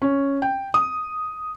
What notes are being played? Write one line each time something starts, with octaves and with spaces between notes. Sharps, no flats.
C#4
G5
D#6